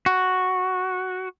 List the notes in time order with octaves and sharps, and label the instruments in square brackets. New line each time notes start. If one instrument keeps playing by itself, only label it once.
[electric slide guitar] F#4